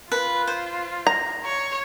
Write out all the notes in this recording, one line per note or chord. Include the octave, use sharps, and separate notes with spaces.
F4 B4
C5
A#5
C#5